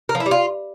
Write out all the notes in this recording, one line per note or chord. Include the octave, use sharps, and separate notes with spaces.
A#4
F3
E4
G3
F4